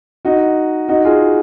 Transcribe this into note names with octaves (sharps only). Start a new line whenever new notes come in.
D#4 F#4
D#4 F#4
F4 G#4